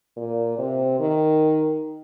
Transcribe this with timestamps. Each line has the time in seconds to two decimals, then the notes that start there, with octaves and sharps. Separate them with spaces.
0.17 A#2
0.58 C3
0.99 D#3